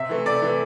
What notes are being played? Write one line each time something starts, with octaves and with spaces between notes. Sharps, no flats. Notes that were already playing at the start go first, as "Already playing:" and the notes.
Already playing: C3 E5
E3 A3
C3 D5
E3 A3